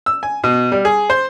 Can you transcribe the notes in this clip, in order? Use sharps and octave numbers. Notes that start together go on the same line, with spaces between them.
E6
G#5
B2
G3
G#4
C5